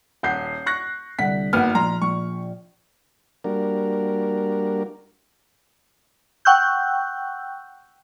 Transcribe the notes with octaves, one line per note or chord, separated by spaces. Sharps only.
D#1 F#5 G6 C7
C#6 F#6 A#6
C2 D3 F#5 B6
G#1 A#3 B3 F#5 F6
A#1 A#5 C6
A#1 C#6
G3 A#3 D4 F#4 A#4
F#5 G5 C#6 E6 F#6 G6